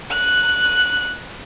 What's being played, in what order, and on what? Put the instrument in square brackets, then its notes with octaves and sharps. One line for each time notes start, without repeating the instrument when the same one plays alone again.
[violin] F#6